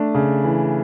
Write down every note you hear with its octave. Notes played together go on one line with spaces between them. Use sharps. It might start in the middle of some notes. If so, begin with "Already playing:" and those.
Already playing: A3 D4
C#3
E3